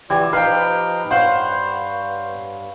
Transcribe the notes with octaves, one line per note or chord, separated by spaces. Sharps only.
E3 F#4 G4 D5
F3 D#4 B4 F5 G5 A#5
G2 C5 C#5 F5 F#5